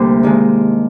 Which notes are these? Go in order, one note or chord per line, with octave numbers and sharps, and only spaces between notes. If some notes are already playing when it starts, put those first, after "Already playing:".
Already playing: D2 C3 G3 A#3 C5
G2 D#3 G#3